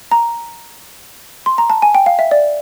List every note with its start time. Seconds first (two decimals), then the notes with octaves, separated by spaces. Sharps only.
0.12 A#5
1.46 C6
1.58 A#5
1.70 A5
1.82 G#5
1.95 G5
2.06 F5
2.19 E5
2.31 D5